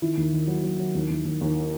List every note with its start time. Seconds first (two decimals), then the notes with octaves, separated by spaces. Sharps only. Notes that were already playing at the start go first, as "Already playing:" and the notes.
0.02 D#3 E4
0.17 D#2
0.32 D#3
0.47 F#3
0.63 F#3
0.79 F#3
0.95 D#2
1.10 D#2
1.25 D#2
1.41 D#2